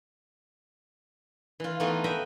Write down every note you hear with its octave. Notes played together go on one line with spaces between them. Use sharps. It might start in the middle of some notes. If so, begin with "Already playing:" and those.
E3 F4
E3 A3 B3 D#4 F4
B4 D#5 E5 G5 A#5 B5